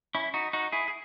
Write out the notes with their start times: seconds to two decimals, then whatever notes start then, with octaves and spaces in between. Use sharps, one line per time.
0.15 C#4 E4
0.34 D#4 F#4
0.53 D#4 F#4
0.72 E4 G#4
0.88 G#4